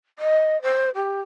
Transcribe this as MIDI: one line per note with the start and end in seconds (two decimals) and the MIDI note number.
0.18 0.60 75
0.62 0.89 72
0.95 1.21 67